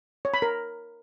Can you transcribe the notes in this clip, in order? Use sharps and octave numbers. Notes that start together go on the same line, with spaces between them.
C#5
B5
A#4